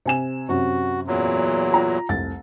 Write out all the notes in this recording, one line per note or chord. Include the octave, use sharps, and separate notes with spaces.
C3 G#5 E7
F#2 C3 F#4
E2 A#2 F#3
F4 A#5
F1 C2 A6